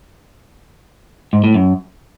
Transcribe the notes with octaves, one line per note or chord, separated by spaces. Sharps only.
G#2
A2
F#2